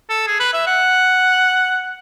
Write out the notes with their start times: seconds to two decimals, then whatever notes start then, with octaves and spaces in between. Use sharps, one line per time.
0.09 A4
0.27 G#4
0.40 B4
0.53 E5
0.67 F#5